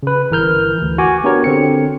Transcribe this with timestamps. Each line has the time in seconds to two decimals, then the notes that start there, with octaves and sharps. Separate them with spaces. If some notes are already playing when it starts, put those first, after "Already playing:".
0.03 C#3 B4
0.31 G1 E3 A#4 F6 G6
0.78 D2 E3
0.98 F#4 G#5 D6
1.24 B3 D4 F#4 G4 A#4 C#5
1.44 D3 C4 C#7